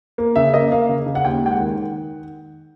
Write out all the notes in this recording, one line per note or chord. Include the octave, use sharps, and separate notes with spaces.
A#3
C#3 E5
A#3 D#5
A#3 F5
C#3
C#3
F#5
D#2 G5
G#3 G5
F#5
D#3
D#3